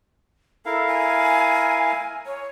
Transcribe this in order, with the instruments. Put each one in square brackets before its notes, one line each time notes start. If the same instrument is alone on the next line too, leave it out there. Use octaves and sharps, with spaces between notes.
[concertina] E4 A#4 F5 [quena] A4
[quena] G#5
C#5